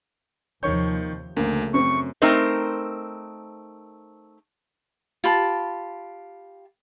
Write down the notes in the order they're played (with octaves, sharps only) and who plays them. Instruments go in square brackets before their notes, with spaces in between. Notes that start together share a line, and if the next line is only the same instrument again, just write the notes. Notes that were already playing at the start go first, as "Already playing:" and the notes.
[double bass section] D#2 C3 F3 [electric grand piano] D#3 C#6 G6 [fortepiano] C#5
[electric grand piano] D2 [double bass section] C#3 A3 [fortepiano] A#3
[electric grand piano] F#2 [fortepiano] C4 C5 [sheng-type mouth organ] C#6
[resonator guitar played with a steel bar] A3 C4 D#4 A#4 C5
[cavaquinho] F4 G4 A5 B5